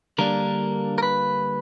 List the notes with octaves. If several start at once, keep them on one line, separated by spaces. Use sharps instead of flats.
D3 G3 A#3 D4 A#4
A#4
B4